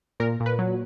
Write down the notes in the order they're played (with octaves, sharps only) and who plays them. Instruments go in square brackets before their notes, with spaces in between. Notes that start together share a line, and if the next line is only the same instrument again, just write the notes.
[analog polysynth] A#2 A#4
A#2
B4
F#3